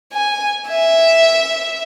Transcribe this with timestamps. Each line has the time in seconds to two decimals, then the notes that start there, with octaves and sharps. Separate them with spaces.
0.13 G#5
0.69 E5